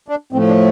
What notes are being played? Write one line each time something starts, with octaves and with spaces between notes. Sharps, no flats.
D4
A2 F3 A3 C4
D4